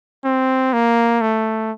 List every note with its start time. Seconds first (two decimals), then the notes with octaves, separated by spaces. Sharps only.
0.24 C4
0.73 A#3
1.21 A3